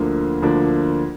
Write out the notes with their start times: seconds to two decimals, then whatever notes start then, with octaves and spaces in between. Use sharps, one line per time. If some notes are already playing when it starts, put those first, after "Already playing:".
Already playing: D2 D3 F3 A#3
0.42 D2 D3 F3 A#3 D4